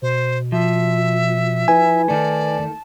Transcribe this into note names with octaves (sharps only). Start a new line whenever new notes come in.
B2 C5
F3 E5
E4 B4 G#5
D#3 A3 D5 A5